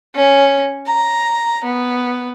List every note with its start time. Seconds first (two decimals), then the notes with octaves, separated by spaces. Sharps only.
0.15 C#4
0.87 A#5
1.64 B3